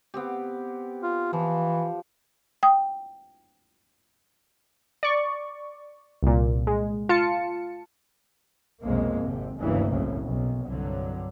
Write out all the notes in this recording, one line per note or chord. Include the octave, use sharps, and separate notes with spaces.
B3 C4 G4
F4
E3 F3
G5 D#6
D5 C#6
C2 A#2
G#3
F4 A5 C#7
B1 F2 C3 G#3 A#3
G#1 C3
F1 D2 G2 C#3 E3 A#3
C2 F#2 A2 C#3
B1
C2 G2 D3 F#3